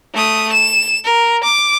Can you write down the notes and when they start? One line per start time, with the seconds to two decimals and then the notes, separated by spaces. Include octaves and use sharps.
0.15 A3 D#6
0.52 E7
1.05 A#4
1.44 D6